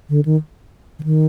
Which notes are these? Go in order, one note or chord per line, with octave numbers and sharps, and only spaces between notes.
D3
D#3
D3
D#3